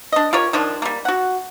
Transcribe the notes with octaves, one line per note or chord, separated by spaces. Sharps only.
D4 D#5
F4 G4 A#4 C#5
D#3 F3 D4
G3 A#3
F#4 F#5